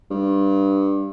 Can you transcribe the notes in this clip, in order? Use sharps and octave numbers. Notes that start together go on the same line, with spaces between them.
G2